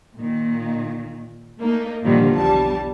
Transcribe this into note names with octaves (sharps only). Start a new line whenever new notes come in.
A#2 D#3
A3 A#3 D#4
G2 A#2 D3 D#3 F3 G3
B1 E2 G3 A5